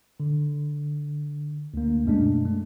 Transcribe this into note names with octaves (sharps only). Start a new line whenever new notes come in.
D3
D2 A#3
F#2 B2 G#3 A3 D4
G#3 A3